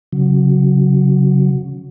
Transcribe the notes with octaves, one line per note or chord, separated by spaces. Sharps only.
C#3 F#3